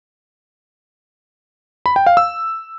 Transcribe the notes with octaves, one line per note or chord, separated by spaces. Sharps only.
B5
G5
F5
E6